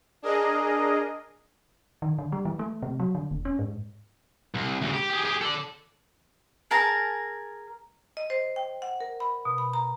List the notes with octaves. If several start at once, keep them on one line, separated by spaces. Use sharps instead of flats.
D4 G#4 A#4 D#5
D#3
D3
G3
E3
A3
C3
F#3
D3
E1
C#4
G#2
C2
D2 C#3
G4
G4 G#4
G4 G#4
A4 D5
G#4 A#4 A5 A#5
D#5
C5
G5
F#5
A#4
B5
B2
B5
A#5